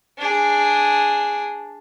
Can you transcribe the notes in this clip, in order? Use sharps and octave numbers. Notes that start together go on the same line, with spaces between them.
D4 G#4